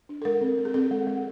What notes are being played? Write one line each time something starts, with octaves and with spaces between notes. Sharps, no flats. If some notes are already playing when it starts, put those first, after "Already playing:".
D4
A4
G#3 A#4
C4
G#3
G#4
C4 A4
G#3
G#3